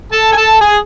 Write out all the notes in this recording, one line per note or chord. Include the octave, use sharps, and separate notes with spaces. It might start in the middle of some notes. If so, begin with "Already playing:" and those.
A4 A5
G#5
A4 A5
G#4 G#5